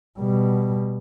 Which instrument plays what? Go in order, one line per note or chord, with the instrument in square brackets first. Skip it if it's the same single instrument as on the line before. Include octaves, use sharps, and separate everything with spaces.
[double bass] B2 G3